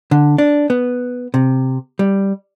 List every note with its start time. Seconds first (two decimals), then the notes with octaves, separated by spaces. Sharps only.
0.11 D3
0.38 D4
0.70 B3
1.34 C3
1.99 G3